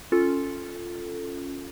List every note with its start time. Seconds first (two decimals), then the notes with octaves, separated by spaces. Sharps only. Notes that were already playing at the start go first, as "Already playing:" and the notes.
0.12 C#4 F4 A4